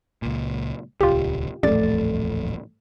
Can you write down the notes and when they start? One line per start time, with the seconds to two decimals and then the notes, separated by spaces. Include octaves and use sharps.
0.22 C#2 A#2
1.01 D#1 C#2 F4 G4
1.63 D#1 A1 F2 A3 D5 A6